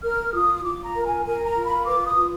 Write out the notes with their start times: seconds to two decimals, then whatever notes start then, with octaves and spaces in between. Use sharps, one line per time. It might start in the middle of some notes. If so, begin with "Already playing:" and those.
0.03 A#4 F6
0.34 F4 D#6
0.64 F4 D6
0.84 A#5
0.94 A#4
1.05 G#5
1.25 A#4 G#5
1.45 A#5
1.56 F4
1.66 B5
1.86 B4 D6
2.06 D#6
2.16 F4